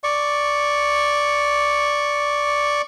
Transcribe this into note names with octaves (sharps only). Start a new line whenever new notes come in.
D5 C#6